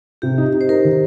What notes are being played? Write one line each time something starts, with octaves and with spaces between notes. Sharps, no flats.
C3 G4
D#4
D#4
C5
D#4 A#4
D#3